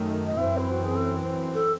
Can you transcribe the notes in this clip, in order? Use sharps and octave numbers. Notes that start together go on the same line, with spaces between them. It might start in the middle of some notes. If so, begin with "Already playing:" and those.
Already playing: F#2 D#3 A3
D#5
F#2 E3 C4 E5
E4
F#4
G#4
A4
A4